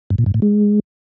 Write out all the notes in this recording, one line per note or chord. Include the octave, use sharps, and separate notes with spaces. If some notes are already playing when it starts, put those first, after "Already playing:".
G2
A#2
G2
A2
G#3